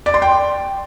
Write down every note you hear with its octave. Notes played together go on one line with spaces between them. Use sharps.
D5
C6
G5